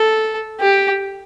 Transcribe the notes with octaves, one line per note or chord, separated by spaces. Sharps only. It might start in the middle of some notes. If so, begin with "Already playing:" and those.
Already playing: A4
G4